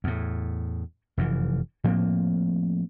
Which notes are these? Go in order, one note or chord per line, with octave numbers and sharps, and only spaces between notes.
E2 A2
F1 F#2 E3
A2 F3 A#3 C4